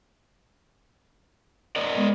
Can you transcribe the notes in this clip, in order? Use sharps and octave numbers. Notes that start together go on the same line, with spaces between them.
A#4 D5 D#5
G#3 B3